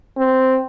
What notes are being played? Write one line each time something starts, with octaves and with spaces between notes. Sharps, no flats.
C4